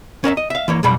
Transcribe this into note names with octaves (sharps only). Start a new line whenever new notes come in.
C#4 A#4 D#5 E5
D#5
E5 F5
E3 A#3 C#5
B1 F2 B2 G3 B5